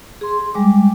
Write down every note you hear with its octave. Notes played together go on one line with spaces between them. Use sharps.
G#4 C6
G3 G#3 D6